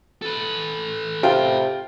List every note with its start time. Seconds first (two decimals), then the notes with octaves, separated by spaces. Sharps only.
0.22 A4 B4
1.23 C3 F4 G5